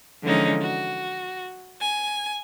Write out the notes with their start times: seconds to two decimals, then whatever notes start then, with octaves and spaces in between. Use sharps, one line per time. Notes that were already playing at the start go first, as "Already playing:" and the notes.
0.23 D3 E3 F3 G#3 C#4 D#4
0.61 F#4
1.81 G#5